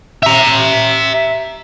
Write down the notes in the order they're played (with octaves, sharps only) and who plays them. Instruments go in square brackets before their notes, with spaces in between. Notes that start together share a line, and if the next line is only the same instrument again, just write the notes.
[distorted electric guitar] E5 A#5